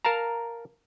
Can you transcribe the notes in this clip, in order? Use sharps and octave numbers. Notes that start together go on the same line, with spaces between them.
A#4 F5 A5 A#5